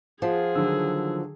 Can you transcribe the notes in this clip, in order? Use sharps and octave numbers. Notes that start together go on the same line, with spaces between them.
F3 F4 G#4 F5 F#5
D3 D#3 F#3 E6